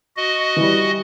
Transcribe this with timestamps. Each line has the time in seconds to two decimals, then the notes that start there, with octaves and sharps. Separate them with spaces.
0.17 F#4 D#5
0.56 E3 G3